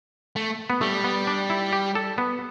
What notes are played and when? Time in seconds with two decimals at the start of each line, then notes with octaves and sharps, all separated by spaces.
0.36 A3
0.70 B3
0.81 G3 A3
1.04 B3
1.27 D4
1.50 E4
1.73 G4
1.95 A4
2.18 B3